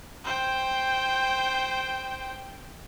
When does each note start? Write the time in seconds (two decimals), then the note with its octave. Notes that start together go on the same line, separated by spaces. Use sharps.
0.24 C5 G5